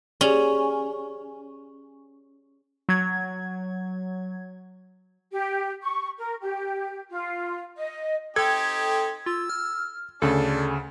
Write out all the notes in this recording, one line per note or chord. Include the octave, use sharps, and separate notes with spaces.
C#4 G4 G#4 D5
F#3 G#6
G4
C#6
A#4
G4
F4
D#5
C4 D#4 G4 A4 G#6
F4 E6
F6
D2 C#3 D4 A4